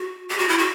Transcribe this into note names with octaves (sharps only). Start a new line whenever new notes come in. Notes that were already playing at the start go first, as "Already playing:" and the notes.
Already playing: F#4
G4
F#4
E4
F#4